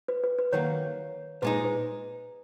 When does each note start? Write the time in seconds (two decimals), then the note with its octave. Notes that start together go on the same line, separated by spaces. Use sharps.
0.08 B4
0.24 B4
0.39 B4
0.52 D#3 F#3 A#3 C#5
1.42 A#2 G#3 D#4 B4
1.65 B4